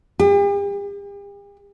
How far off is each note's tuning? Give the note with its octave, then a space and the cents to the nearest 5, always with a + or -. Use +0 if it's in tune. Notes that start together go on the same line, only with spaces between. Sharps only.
G4 +45